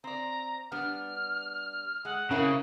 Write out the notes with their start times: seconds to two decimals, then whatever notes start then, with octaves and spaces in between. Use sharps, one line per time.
0.04 C4 D5 A#5
0.72 G3 B3 D4 F6
2.05 G#3 F#5
2.31 C#3 A#3 C4 E4